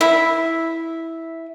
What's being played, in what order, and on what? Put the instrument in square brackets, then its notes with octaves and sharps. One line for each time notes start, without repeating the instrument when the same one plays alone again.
[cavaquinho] E4 E5